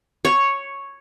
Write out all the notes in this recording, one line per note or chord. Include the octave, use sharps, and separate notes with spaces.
C#5